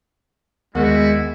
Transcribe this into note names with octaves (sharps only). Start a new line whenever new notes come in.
D#2 G3 G#3 B3 E4 F#4 A#4